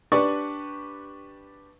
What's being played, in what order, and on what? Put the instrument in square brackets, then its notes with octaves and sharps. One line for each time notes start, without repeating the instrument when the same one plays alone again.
[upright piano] D4 G4 B4 D5 C#6